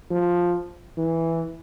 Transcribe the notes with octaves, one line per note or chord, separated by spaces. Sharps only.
F3
E3